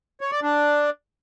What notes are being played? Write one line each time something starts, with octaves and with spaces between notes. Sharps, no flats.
C#5
D5
D4